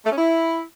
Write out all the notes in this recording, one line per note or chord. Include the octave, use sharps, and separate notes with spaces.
A3
C#4
E4